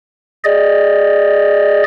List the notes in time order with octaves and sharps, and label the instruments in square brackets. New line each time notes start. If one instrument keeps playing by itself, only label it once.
[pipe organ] G#4 D5 D#5